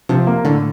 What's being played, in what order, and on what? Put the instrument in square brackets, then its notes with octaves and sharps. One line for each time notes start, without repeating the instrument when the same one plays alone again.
[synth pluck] C3 [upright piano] F3
[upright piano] A#3
[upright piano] A2 [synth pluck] D3